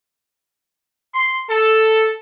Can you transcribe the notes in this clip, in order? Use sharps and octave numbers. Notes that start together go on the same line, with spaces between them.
C6
A4